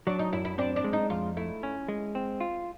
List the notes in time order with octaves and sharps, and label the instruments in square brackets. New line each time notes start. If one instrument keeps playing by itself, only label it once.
[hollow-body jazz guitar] F#3 [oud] D4
[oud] D#4
[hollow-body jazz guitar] F#2 [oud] E4
[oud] E4
[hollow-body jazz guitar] C4 [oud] D4
[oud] D4
[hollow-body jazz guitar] G#3
[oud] D#4
[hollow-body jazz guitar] F2 [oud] F4
[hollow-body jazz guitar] A3 [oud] E4
[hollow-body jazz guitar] C#4
G#3
C4
F4